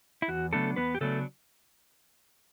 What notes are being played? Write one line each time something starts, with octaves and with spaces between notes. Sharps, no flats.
E4
E2 F#4
C#3 F#3 A3 B3 D4 A4
E2 B3 B4
G4
C#3 F#3 A3 B3 D4 A4